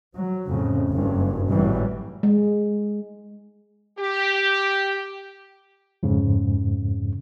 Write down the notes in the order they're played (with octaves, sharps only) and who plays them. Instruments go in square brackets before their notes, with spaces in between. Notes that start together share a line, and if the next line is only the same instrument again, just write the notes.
[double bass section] F#3
F2 A2 C#3
F#1 G2
G#1 A2 E3 F#3 G3
[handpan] G#3
[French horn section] G4
[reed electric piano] F2 G#2 C#3